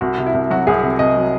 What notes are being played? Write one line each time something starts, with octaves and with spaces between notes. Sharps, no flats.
C2 F#4
C3
E4
C2
F#3 F#4
C2 G#4
C3
C2 D#5
F#3